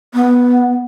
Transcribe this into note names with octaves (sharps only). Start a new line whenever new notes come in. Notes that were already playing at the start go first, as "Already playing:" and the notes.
B3